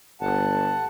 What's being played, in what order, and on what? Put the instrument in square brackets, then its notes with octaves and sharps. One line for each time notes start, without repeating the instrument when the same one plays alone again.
[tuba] G1 [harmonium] F#5 A5